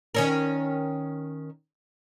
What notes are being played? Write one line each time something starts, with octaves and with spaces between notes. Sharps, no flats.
D#3 C#4 A#4